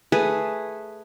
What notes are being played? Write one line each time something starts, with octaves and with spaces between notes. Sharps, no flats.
A3 G#4 B4